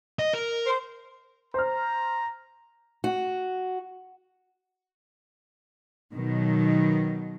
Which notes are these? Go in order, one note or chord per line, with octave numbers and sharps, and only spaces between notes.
D#5
A#4
C5
C5 A#5 F6
F#4
B2 D#3 F#3